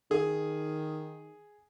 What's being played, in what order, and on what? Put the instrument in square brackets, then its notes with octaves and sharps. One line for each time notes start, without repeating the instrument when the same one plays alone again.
[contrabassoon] D#3 [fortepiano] G#4